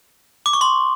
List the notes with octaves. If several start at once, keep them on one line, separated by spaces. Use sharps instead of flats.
D6
C#6
C6